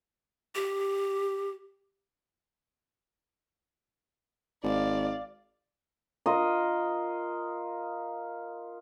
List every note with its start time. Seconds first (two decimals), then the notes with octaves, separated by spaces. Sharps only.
0.56 G4
4.63 G#1 D5 F5
6.26 F4 A#4 D#5